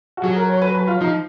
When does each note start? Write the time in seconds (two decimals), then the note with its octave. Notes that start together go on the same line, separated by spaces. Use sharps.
0.17 F#4
0.24 F#3 G#4
0.36 A#4
0.49 C#5
0.62 B4
0.75 B4
0.87 F4
1.01 F3 D#4